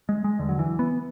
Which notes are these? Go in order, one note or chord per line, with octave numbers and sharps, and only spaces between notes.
G#3
G#3
E2 D3
F#3
E3
B3